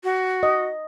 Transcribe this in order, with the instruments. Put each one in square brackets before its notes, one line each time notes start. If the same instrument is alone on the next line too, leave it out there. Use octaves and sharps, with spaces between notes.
[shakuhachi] F#4
[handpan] D#5